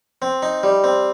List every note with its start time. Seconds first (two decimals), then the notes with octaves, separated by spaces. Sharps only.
0.22 C4
0.42 D#4
0.63 G3
0.84 C4